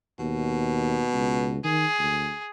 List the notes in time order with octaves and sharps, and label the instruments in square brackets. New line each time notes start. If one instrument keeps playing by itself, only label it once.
[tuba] D#2 [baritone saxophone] B2
[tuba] C#2
[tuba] D#3 [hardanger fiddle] G#4
[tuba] D2